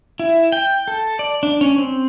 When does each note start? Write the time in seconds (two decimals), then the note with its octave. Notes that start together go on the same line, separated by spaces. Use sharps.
0.19 E4
0.52 G5
0.88 A4
1.19 D5
1.43 D4
1.61 C#4
1.78 C4